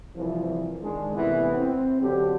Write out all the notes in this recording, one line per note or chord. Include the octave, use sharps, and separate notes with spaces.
C2 E3 F3
D#3 G#3 D4
A2 C3 E3 B3
C4
D3 F#3 G4